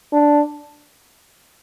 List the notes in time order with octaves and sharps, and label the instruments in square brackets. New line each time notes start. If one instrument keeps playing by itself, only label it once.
[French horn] D4